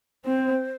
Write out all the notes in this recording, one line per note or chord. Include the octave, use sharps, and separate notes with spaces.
C4 C5